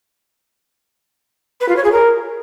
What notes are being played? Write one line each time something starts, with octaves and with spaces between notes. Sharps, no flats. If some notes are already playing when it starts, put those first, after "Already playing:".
B4
F4
C#5
G#4
A#4